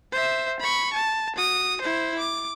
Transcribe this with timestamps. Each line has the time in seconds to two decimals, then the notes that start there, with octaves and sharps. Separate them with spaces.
0.12 C5 E5
0.59 B5 C#6
0.93 A5
1.36 F#4 D#6
1.81 E4 C5
2.19 D6